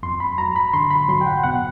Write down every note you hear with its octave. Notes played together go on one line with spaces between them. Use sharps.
F2 C6
B5
F#3 A#5
B5
D3 C6
B5
F#3 C6
G5
F#5
B2 F#5